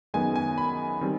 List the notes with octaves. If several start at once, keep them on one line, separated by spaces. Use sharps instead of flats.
F#2 D#3 G#3 B3 G#5
G#5
B5
D#3 G3 C4